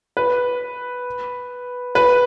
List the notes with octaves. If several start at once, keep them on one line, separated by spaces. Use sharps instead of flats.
B4
B4